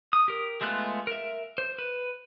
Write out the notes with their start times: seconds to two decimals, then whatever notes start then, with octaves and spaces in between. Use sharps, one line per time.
0.13 D#6
0.28 G4 A#4
0.61 G#3 A3 B3 F4 F#6
1.07 A#4 E5
1.58 C5
1.79 B4